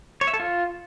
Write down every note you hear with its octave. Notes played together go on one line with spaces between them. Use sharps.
C#5
E5
A4
F4